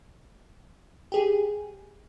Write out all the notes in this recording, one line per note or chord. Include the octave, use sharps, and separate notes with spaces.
G4 G#4